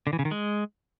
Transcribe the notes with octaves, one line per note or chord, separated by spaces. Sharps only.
D3
E3
C#3
D#3
G#3